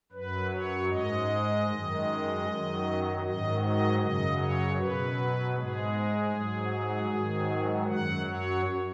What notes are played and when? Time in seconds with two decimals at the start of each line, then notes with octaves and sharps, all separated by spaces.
0.12 F#2 F#3 B4
0.51 C#5
0.90 G#2 G#3 D#5
1.67 F#2 D#3 G#3
2.45 F#2 D#3 F#3
3.22 G#2 D#3 F#3 D#5
3.61 D#5
4.00 F#2 C#3 F#3 D#5
4.39 C#5
4.77 B2 F#3 B4
5.54 G#2 G#3 G#4
6.32 G#2 F#3
7.10 G#2 D#3 F#3
7.87 F#2 F#3 F#5
8.26 C#5